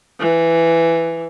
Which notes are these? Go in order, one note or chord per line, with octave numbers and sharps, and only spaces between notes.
E3